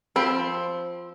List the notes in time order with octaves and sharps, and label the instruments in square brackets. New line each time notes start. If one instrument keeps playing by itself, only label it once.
[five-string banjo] F3 C4 C5 G5 B5